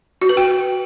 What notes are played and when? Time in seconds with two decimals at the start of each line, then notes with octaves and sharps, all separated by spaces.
0.22 F#4
0.29 B4
0.37 G5